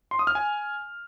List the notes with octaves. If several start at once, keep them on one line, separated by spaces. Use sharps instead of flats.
C6
D#6
F6
G#5